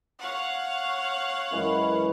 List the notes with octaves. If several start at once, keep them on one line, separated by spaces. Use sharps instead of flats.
C#5 F5 F#5
F#2 E3 G#3